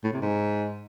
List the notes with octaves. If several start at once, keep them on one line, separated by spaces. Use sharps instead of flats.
A2
C3
G#2